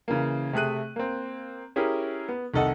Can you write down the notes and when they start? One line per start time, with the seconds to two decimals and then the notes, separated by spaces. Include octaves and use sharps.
0.08 C#3 E3 A#3
0.53 C3 A3 G#4 F#6 D#7
0.96 A#3 C4
1.76 C#4 E4 G4 G#4 A#4
2.29 B3
2.54 C2 D#3 A4 D#5 F#5